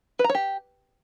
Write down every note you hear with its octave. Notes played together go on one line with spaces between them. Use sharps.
B4
A#5
C#5
G4